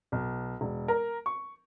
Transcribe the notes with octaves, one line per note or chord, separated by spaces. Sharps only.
B1
E1
A#4
C#6